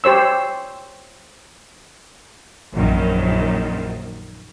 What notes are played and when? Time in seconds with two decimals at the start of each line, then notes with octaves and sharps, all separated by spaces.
0.04 G4 C5 C#5 E6
2.73 A#1 F#2 D#3